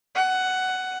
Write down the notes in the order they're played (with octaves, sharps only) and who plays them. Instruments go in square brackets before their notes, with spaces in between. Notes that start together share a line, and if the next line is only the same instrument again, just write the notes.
[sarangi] F#5